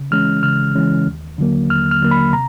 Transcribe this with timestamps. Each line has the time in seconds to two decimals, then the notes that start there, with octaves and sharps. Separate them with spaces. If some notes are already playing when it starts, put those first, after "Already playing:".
Already playing: C#3
0.11 E3 G#3 C#4 F6
0.43 C#3 F6
0.75 E3 G#3 C#4
1.07 D#2
1.38 D3 F#3 A#3
1.69 D#2 F6
1.91 F6
2.01 D3 F#3 A#3
2.11 B5
2.33 C3 A#5